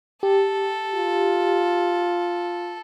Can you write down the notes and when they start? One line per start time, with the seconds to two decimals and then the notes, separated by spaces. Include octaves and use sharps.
0.23 G4 A4
0.95 F4